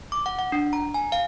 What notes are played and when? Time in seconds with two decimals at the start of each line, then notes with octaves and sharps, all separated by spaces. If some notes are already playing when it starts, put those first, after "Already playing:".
0.12 D6
0.26 F#5
0.39 F#5
0.52 D4
0.73 A#5
0.94 G#5
1.12 F5